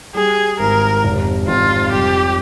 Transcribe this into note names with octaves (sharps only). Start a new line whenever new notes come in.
G3 G#4
G#1 A#4
F1
F2 F4
G3 G4